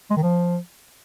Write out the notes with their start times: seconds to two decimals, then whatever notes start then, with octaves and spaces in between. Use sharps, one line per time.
0.10 G#3
0.17 D#3
0.23 F3